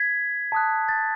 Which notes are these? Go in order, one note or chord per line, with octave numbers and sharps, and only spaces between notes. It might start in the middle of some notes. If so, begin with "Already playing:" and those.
Already playing: G#6 B6
A5 D#6 F#6
A6